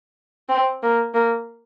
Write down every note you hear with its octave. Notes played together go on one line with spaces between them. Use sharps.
C4
A#3
A#3